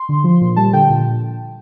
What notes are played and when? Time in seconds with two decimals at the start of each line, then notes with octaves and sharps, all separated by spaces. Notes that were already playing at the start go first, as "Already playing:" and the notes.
Already playing: C6
0.09 D3
0.24 F3
0.41 A#2
0.56 G3 A5
0.73 D3 G5
0.89 A#2